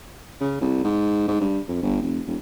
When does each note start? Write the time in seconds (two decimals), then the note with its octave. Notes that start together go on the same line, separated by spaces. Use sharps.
0.41 C#3
0.61 C2
0.84 G#2
1.28 G#2
1.41 G2
1.68 F2
1.82 G1
2.02 F1
2.27 E1